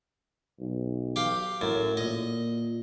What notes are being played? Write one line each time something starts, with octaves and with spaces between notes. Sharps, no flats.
B1
G4 F5
F#2 A2
A#2 D#5